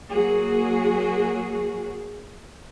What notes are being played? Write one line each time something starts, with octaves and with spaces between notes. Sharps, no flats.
F#3 A#3 F#4 G#4